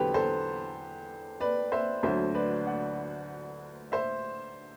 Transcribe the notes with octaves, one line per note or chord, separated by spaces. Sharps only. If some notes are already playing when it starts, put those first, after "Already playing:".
Already playing: E2 D3 F#3 G4 A4 B4 C5
A4 C5
B4 D5
C5 E5
D2 D3 F#3 C5 E5
B4 D5
D5 F#5
C5 E5